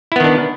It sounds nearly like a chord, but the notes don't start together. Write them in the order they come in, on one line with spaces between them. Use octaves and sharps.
E4 B3 D#3 D4